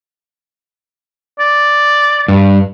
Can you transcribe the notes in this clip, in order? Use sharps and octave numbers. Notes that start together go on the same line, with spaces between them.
D5
G2